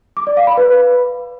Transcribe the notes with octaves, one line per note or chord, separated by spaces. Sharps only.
D6
D5
F5
B5
B4